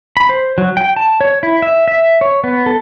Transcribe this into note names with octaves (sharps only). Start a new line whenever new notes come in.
B5
C5
F#3
G5
A5
C#5
E4
E5
E5
C#5
B3
A4